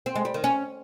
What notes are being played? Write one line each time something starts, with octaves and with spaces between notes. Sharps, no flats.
C4
G#3
G3
D#3
C#4